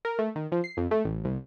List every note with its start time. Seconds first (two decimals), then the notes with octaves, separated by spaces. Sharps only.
0.05 A#4
0.19 A3
0.36 D#3
0.52 F3
0.64 C7
0.77 F2
0.91 A3
1.05 A1
1.25 C2